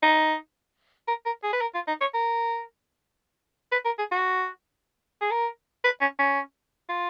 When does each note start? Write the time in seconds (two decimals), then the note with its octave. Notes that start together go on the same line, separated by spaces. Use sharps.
0.03 D#4
1.08 A#4
1.26 A#4
1.43 G#4
1.53 B4
1.61 A#4
1.74 F4
1.87 D#4
2.01 C#5
2.14 A#4
3.72 B4
3.85 A#4
3.99 G#4
4.11 F#4
5.21 G#4
5.31 A#4
5.84 B4
6.01 C#4
6.19 C#4
6.89 F4